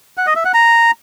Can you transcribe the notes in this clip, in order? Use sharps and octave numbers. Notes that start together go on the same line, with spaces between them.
F#5
D#5
E5
F#5
A#5